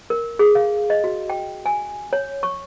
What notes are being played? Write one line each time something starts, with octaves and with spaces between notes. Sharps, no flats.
A#4
G#4
F5
D#5
F#4
G5
G#5
C#5
C#6